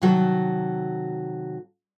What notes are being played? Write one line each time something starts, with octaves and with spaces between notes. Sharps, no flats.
C3 D#3 F#3 F#4 A4